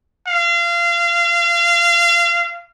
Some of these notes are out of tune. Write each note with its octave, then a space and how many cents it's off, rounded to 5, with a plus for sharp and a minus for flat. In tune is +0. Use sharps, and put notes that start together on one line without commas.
F5 -25